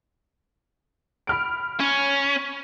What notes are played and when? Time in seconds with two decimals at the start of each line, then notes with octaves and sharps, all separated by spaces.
1.27 B5 F6 D7
1.80 C#4